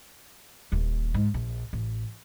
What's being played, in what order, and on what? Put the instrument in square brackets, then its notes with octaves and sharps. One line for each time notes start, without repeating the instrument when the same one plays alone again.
[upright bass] D#1 D#2
G#2
A#1
A1